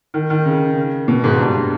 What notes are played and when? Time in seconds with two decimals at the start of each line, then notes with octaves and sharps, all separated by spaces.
0.14 D#3
0.30 D#3
0.46 C#3
1.08 B2
1.24 G#2
1.39 G2